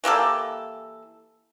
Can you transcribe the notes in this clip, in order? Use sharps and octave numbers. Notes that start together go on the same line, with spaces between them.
E3 A#3 G4 A4